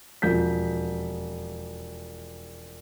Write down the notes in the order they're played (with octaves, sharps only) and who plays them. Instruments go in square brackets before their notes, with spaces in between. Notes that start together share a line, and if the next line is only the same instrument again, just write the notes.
[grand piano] E1 F2 G6 B6